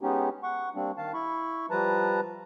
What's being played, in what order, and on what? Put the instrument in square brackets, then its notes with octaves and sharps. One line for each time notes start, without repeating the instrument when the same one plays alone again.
[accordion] G#3 B3 C#4 D#4 G4
F#5 C#6
G3 A#3 C4 D4
D#3 F5 A5
E4 B5 C#6
F3 G3 B4 A5 A#5